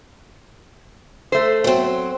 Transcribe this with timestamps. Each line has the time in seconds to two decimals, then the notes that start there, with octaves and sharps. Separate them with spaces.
1.32 A3 C5
1.64 F#3 C4